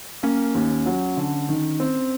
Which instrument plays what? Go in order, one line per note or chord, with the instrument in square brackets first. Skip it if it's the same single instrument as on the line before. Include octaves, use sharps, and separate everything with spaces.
[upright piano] A#3 [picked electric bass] C#4
[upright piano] D#2
F#3
D3
D#3
C4